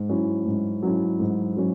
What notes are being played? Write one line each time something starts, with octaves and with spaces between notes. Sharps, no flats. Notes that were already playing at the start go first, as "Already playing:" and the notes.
Already playing: G#2
F#3 C#4 E4
G#2
F#3 C#4 E4
G#2
F#3 C#4